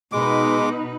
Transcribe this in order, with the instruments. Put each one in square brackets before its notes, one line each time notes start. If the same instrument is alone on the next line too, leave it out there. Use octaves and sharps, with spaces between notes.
[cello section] B2 D#4 B4 [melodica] G#3 D6